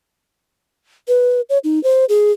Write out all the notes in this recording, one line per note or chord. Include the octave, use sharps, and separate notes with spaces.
B4
C#5
D#4
C5
G#4